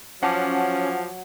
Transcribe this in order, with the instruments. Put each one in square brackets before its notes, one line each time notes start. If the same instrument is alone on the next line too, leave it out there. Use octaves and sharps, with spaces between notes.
[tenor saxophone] F3 [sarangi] F#3 [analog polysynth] C#4 [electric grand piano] F#5 A5 D6